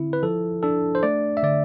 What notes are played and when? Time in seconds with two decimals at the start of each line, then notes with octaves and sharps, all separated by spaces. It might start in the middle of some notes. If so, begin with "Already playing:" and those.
Already playing: D3 C4 E4
0.13 B4
0.23 F3 A4
0.63 D4 A4
0.95 C5
1.03 A3 D5
1.37 E5
1.43 D3 D5